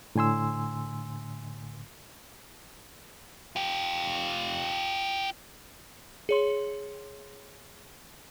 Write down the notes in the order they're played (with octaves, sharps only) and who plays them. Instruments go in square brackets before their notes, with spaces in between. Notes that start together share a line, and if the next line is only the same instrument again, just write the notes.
[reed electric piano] A2 D3 G#5 C6 E6
[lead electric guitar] F4 G4
[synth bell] G#4 C#5 C6